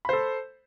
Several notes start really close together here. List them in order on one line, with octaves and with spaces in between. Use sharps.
B5 C5 A4